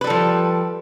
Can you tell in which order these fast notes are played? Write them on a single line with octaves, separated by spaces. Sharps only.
B4 G3 A4 F3